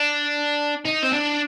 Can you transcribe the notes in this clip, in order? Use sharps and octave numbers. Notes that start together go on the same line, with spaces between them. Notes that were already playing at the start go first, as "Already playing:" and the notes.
Already playing: D4
D#4
C4
D4